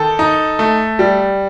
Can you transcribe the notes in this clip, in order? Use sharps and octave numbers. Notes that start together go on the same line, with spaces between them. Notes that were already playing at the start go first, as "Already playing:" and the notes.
Already playing: D#3 A4
D#4
A3
G3